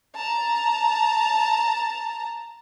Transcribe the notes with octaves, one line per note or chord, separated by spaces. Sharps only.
A5 A#5